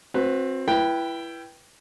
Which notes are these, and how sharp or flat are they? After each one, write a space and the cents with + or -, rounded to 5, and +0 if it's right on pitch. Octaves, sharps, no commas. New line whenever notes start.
C4 +20 F#4 -25 B4 +10
E4 +25 B4 -15 G5 +0